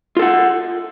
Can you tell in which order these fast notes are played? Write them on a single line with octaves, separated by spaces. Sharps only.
F4 A4 F#5